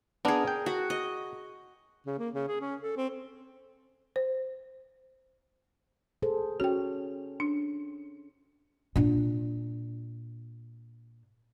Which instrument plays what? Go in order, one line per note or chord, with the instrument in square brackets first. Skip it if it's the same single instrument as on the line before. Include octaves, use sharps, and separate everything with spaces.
[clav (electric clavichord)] B3 D4 [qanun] G#4 A#4
[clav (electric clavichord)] G5
[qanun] F#4
D#5
[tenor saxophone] C#3
A#3
C#3
G#4
C#4
A4
C4
[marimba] C5
[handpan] G#4 A4 C5
[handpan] C#4 C#5 [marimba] F#4 G5
[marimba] D4
[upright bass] A#2 D4